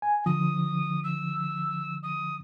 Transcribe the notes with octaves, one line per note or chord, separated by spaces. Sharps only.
G#5
D3 F3 D#6
E6
D#6